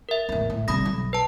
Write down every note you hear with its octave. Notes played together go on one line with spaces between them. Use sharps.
A#4 E5
A1 E2
A2
G2 C3 B5 D#6 A#6
B1
B4 A5